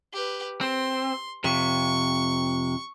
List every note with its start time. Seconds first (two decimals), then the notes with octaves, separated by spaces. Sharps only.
0.13 G4 B4
0.61 C4 C6
1.44 F2 C3 C#6